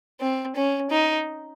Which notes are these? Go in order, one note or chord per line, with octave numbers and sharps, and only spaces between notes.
C4
C#4
D#4